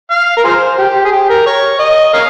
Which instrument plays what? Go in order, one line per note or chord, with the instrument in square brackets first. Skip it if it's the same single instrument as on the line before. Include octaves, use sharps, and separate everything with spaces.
[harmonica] F5
A#4
F4 G#4 C5
G4
G#4
G4
A#4
C#5
D#5
A#4 C#5 F5